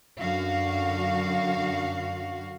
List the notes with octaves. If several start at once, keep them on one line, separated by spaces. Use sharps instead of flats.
F#2 D3 F#4 F5